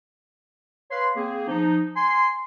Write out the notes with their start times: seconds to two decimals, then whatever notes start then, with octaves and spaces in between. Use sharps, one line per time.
0.91 B4 C#5 F5 C6
1.16 A#3 C4 G#4
1.48 F3 D#4
1.96 G#5 C6